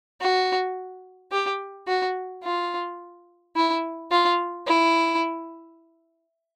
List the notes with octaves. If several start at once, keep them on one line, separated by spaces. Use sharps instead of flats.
F#4
G4
F#4
F4
E4
F4
E4